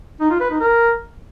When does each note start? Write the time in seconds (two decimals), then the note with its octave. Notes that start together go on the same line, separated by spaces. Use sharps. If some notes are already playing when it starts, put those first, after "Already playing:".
0.21 D#4
0.31 F4
0.40 B4
0.50 D#4
0.60 A#4